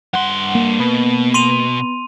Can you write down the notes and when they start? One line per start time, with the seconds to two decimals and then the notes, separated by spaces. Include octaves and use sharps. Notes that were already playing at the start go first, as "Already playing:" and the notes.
0.14 G2 F#5 C6
0.55 A#3
0.80 B2 B3
1.34 C6 D#7 F7